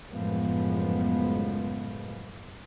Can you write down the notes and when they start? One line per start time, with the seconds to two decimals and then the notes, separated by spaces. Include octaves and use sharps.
0.12 F#2 A2 C#3 F3 G#3 B3